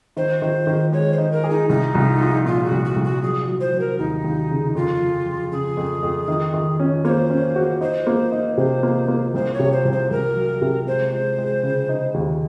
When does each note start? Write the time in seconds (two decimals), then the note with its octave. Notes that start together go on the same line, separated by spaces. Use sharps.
0.16 D#3 C5
0.42 D#3
0.67 D#3
0.92 G#3 C#5
1.12 C5
1.18 D#4
1.31 A#4
1.44 G#4
1.50 D#4
1.69 C2 D#4
1.95 C2
2.20 F3
2.46 A#2 F4
2.64 F#4
2.71 C2
2.84 F#4
2.96 C2
3.04 F#4
3.22 F#3 G#4
3.48 F#3
3.60 C5
3.73 F#3
3.79 A#4
3.98 D#2 D#4
4.24 D#2
4.49 C#3
4.75 F2 F4
5.00 F3
5.26 F3
5.51 C#3 G#4
5.77 F2
6.02 F2
6.28 D#3
6.54 D#3
6.80 C#4
7.04 A#3 C5 C#5
7.30 C#4
7.56 F#4
7.81 D#4 C5
8.07 A#3
8.32 D#4
8.57 C3 C5
8.83 A#3
9.08 A#3
9.34 C2 C5
9.53 C#5
9.59 C3
9.72 C5
9.85 C2
9.92 C5
10.10 C2 A#4
10.36 F#3
10.62 C3
10.87 G#3 C5
11.12 G#3
11.38 G#3
11.63 C#3
11.89 D#4
12.14 D#2